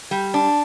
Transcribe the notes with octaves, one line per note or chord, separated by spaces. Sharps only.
G3
D4